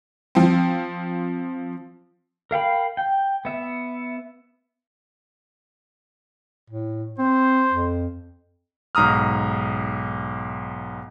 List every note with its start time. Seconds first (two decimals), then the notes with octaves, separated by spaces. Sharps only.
0.35 F3 C4
2.51 A#4 F5 G5 B5
2.97 G5
3.45 B3 E5
6.70 A2
7.18 C4 C5
7.72 F2
8.95 B1 G#2 A#5 D#6 F6